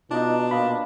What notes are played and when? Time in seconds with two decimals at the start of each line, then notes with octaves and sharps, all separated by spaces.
0.11 B2 D4 D#4 F4 D#5
0.51 A#2 D#5 F5 B5